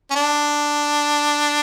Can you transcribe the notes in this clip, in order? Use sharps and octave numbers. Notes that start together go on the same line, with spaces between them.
C#4
D4